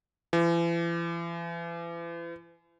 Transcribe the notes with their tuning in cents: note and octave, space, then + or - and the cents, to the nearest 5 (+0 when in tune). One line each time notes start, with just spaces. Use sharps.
E3 +40